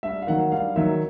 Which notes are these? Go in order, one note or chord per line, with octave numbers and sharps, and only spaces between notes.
G2 E5
F5
D#3 F#3 F#5
G2 F5
D#3 F#3 E5